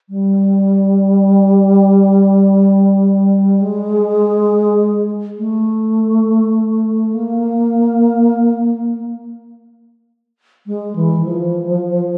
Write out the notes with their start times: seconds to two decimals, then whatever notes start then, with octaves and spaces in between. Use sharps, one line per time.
0.09 G3
3.61 G#3
5.38 A3
7.14 A#3
10.67 G#3
10.96 E3
11.25 F3